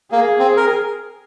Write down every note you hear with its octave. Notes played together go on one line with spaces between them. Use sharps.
A#3 G#4
C4
A#4